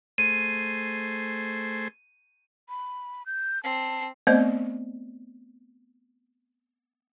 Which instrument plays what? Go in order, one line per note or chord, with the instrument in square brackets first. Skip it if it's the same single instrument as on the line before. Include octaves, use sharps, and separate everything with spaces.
[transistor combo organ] A3 G#4 C5 [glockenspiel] D#7
[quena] B5
G6
[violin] C4 C7 [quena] A5
[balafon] A3 B3 C4 C5 D5 D#5